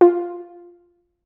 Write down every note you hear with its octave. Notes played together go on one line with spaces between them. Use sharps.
F4